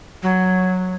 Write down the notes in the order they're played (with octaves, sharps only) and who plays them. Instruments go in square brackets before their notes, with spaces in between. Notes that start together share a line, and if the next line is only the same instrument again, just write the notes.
[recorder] F#3